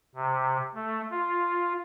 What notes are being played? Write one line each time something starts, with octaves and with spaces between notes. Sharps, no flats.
C3
A3
F4